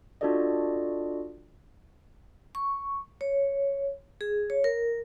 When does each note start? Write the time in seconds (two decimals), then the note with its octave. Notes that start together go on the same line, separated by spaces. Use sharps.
0.21 D4 F4 F#4 A4 D5 D#5
2.55 C#6
3.21 C#5
4.21 G#4
4.50 C#5
4.64 A#4